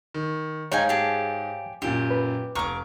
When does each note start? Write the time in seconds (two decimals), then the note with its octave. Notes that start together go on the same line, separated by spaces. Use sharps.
0.14 D#3
0.72 G#2 D#4 C#5 F5 G5 G#5
0.89 G4 G#4 A5
1.82 F#2 A#2 G4
2.11 B4
2.55 F1 A#5 C#6 D6 F6